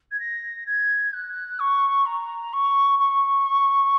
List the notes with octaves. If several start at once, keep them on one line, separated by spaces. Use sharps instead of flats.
G#6
A#6
G#6
F#6
C#6
A#5
C#6
C#6